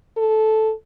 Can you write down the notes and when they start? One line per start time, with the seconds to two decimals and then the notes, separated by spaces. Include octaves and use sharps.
0.17 A4